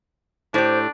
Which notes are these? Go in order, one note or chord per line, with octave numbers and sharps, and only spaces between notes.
A2 D4 G4 C5